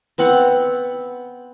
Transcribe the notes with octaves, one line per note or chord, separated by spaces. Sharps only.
B3 C4 F#5 B5